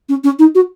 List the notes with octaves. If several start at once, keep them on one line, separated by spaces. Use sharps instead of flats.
C#4
C#4
D#4
F#4